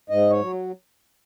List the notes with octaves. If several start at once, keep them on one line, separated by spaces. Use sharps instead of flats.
G#2 D#5
C#5
F#3